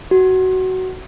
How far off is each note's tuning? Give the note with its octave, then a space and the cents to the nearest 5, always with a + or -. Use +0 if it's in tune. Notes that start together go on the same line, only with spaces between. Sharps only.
F#4 +15